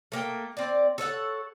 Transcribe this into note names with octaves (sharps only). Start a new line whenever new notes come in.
A3 A#3 G5
C4 D5
A4 C#5 E5 F#5